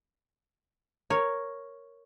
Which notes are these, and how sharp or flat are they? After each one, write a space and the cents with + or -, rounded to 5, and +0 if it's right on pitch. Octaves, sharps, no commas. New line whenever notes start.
A#4 +0 C#5 +0